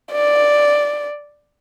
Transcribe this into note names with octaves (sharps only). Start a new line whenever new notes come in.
D5